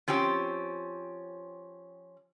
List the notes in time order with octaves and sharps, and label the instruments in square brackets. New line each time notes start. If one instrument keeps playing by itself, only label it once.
[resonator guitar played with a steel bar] F3 C4 C#4 G4